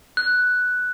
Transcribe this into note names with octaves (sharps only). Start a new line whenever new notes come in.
F#6